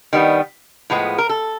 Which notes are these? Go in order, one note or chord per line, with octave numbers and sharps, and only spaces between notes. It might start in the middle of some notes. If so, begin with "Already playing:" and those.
D#3 G3 B3
A2 F3 G#3 B3
A#4
A4